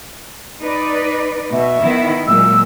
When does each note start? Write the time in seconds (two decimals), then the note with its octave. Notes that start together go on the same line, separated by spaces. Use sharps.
0.61 D#4 B4 D5
1.52 B2 E5
1.81 D#3 B3 E4
2.27 A#2 F#3 G#3 E6